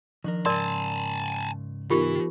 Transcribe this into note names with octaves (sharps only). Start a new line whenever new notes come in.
D#3 F3 D4 A#4
G#2 C#3 A#4 D5 G#5 A5 C6
E3 B3 D#4 F4 G4 A#4